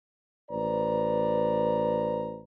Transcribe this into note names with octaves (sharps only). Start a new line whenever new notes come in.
A1 B4 C5 D5 A#5